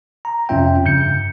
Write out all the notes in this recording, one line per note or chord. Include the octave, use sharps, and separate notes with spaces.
A#5
F2 C3 C#4 F4 E5 G5
G2 C#3 G6 C#7